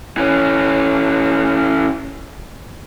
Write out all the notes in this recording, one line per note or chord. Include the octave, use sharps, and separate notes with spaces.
E3 C#4